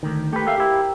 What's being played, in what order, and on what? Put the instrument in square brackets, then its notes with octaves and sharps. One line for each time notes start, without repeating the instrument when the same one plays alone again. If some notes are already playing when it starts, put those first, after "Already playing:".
[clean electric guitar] D2 D#3
[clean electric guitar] A3 B4 [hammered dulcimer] G4 A#4
[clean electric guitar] A4 E5 F5
[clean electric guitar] E4 G4 [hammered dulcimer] C5